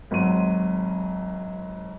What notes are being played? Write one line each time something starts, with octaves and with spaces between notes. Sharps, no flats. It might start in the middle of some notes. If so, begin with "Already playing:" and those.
G#1 F#3 C6 D#7